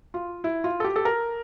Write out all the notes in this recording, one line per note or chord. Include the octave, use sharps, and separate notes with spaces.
F4
E4
F4
A4
G4
A4
A#4